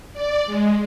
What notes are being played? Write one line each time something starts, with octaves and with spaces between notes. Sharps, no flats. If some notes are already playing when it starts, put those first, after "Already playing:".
D5
G#3